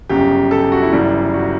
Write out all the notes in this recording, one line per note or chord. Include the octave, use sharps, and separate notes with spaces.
G1 F#2 C#3 G4
A4
G4
F#4
E4
G1 F#2 C#3 E3 G3
F#4